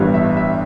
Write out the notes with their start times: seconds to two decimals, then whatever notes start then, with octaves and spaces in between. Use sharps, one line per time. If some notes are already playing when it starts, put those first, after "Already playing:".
Already playing: A1 G2 G3 B3
0.14 E5
0.37 E5